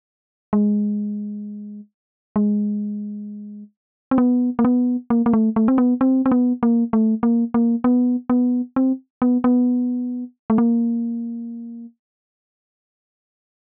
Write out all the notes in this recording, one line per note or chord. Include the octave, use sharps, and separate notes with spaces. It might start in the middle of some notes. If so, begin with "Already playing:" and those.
G#3
G#3
C4
B3
A#3
B3
A#3
A#3
A3
A3
C4
B3
C4
C4
B3
A#3
A3
A#3
A#3
B3
B3
C4
B3
B3
A3
A#3